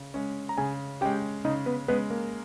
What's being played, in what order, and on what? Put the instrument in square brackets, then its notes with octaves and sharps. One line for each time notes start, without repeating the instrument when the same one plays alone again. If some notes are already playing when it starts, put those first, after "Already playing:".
Already playing: [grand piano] C#3
G#3 C#4
[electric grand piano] A#5
[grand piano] C#3 [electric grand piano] G#4 G#5
[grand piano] G#3 C#4 [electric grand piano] G4 G5
[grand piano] C#3 [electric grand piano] D#4 D#5
[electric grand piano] B3 B4
[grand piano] G#3 C#4 [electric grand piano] B3 B4
[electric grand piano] A#3 A#4